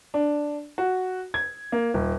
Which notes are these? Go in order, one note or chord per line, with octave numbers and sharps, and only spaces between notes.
D4
F#4
G#6
A#3
D#1